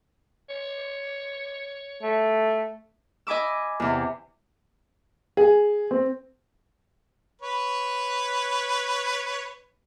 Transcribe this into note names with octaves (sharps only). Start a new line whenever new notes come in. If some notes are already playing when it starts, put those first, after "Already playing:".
C#5
A3
D#5 G#5 B5 D6 E6
E2 C3
G#4
C4
B4 C#5